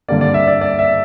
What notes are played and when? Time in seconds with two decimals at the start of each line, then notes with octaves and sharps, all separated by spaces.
0.08 G2 D3 G3 A#3 D5
0.21 D5
0.34 E5
0.47 D5
0.61 D5
0.79 E5